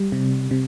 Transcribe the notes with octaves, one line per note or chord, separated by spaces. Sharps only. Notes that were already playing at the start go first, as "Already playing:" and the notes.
Already playing: G3
C3
C3